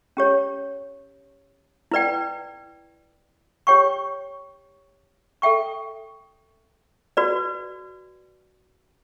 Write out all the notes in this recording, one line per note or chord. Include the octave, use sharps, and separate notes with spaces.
C#4 G4 C#5
E4 B4 D5 G5
G4 C#5 G5 C#6
A4 E5 G5 C#6
F#4 B4 D5